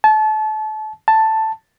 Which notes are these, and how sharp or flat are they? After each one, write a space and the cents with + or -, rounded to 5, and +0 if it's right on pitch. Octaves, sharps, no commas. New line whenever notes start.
A5 -30
A5 +5